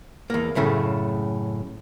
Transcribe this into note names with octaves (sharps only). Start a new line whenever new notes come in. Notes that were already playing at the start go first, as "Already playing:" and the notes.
E2 A#3
F#2 A2 C#3 A3